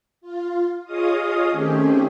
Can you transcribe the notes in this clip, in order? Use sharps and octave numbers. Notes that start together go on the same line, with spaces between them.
F4
F4 G#4 C#5 D#5 F5 D#6
D#3 A3 C4 C#4 G4 G#4